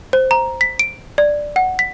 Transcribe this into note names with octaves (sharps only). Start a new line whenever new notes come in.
C5
A#5
B6
D7
D5
F#5
B6